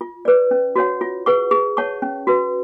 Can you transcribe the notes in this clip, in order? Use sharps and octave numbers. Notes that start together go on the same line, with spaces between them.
F4
B4 D5
C#4
F#4 C#5 F#5
F4
G#4 B4 F#5 C#6
G#4
C#5 F#5 A5 C#6
C#4
F#4 B4